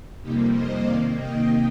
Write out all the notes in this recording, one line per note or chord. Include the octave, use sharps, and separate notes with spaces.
F2 C3 G3 A#3 D#4 G4
C5 D#5
C3 D#3 A#3 D5 F5
D#5 G5